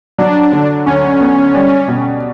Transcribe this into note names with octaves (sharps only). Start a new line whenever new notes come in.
F#3 D4
D3
D2 C#4
B3
G3
B2